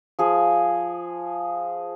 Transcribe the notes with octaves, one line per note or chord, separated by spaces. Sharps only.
F3 G#4